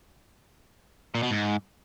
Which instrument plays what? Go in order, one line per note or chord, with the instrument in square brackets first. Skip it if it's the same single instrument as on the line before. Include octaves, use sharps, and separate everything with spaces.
[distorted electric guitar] A#2
B2
G#2